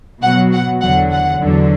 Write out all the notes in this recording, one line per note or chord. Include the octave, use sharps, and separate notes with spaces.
B2 F#3 F#5
F#5
E2 D3 F#3 F#5
F#5
E2 D3 F#3